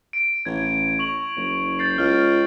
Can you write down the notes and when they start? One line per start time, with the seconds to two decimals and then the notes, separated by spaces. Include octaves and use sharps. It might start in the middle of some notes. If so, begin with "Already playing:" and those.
0.13 D7
0.45 A1 G#6
0.99 C#6 F7 F#7
1.36 F#1
1.79 G6 A6 C7
1.98 C#2 F6